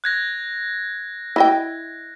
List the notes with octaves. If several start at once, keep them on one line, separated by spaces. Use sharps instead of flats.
F#6 G#6 A#6
E4 D#5 G5